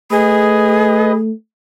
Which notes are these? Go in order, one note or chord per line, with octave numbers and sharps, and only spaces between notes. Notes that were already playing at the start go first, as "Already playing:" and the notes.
A3 G#4 B4 D#5